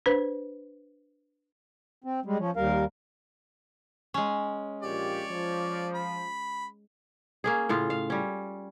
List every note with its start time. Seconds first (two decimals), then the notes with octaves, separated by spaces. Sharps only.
0.06 D4 B4 C5
2.04 C4
2.25 G3 G#3
2.39 F3 C#4
2.57 D#2 G3 A#4 F5
4.14 G#3 C#4
4.83 A#1 F4 G4 C#5 D5
5.30 F3
5.94 B5
7.44 A#3 C#4 G#4
7.69 A2 C#3 F4
7.90 F5
8.10 G3 C#4